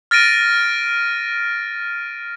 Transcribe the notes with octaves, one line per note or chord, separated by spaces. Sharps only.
F6 A6 A#6 D7 D#7